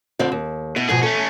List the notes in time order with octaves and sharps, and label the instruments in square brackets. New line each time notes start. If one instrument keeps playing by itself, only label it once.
[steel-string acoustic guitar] F2 D3 C4
D#2
[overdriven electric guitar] B2 [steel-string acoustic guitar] E4
[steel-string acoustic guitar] G#2 B2 F3 [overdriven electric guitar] G#4
[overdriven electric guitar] A3 C#4 [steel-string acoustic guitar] A4